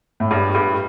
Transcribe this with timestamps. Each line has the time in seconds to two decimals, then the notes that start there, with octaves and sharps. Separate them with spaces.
0.20 A2
0.31 G2
0.55 G2